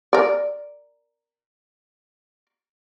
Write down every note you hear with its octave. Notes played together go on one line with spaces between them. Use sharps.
A#4 D5